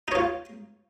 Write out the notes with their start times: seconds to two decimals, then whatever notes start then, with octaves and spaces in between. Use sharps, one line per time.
0.08 D#4
0.12 C#5
0.15 F4